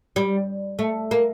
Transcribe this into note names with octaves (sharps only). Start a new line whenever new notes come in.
G3
A3
A#3